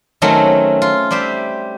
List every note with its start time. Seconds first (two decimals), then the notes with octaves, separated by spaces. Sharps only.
0.22 D#3 F#3 A3 C4 C#4
0.82 F4
1.11 G3 G4 C5 E5